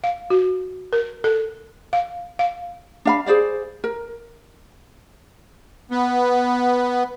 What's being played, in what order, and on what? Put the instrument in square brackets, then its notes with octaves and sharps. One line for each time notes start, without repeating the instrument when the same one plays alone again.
[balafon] F5
F#4
A#4
A4
F5
F5
[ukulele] D4 F5 B5
G#4 C5 D5 F5
A#4
[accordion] B3